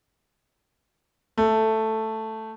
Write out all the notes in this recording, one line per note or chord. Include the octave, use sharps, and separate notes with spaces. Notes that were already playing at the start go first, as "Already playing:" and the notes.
A3